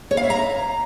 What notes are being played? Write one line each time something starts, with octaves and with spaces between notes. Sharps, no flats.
C#5
F5
E5
A#5